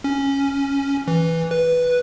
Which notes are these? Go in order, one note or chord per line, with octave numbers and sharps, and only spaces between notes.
C#4
E3
B4